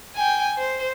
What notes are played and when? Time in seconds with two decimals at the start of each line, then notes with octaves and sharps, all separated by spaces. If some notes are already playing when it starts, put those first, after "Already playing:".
0.15 G5 G#5
0.58 C5